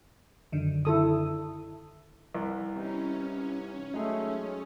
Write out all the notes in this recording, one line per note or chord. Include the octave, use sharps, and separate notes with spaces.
F#2 D3 D#3
E4 A4 D#6
C2 B4
C3 E3 C#4 D#4
F#3 G#3 A3 D#4 G#4